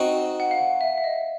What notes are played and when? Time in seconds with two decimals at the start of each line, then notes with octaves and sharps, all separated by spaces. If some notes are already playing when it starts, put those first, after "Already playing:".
Already playing: C4 D#4 F#4
0.40 F#5
0.51 F5
0.81 E5
0.98 E5
1.04 D#5